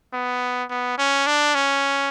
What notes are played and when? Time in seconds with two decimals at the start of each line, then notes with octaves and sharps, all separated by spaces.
0.13 B3
0.70 B3
0.98 C#4
1.27 D4
1.55 C#4